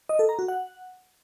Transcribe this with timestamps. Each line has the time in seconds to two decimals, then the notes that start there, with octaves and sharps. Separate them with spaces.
0.09 D#5
0.19 A4
0.29 A#5
0.39 F#4
0.48 F#5